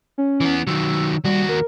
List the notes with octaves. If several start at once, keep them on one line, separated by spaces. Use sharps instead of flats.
C#4
E3 B3
D#3 F#3 E6
D#2 G3 F#4
A#4